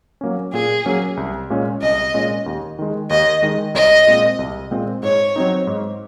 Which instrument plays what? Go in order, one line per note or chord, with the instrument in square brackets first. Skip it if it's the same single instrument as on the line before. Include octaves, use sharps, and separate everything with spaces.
[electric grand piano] F#3 A#3 C#4
[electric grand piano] A#2 [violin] G#4
[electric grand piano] F#3 A#3 C#4
C2
A#2 G#3 C#4
[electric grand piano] C2 [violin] D#5
[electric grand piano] A#2 G#3 C#4
D#2
D#3 G#3
[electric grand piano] D#2 [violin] D#5
[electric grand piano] D#3 G#3
[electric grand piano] C2 [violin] D#5
[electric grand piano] A#2 G#3 C4
C2
A#2 G#3 C4
[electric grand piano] G#2 [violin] C#5
[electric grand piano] F#3 C4 D#4
G#2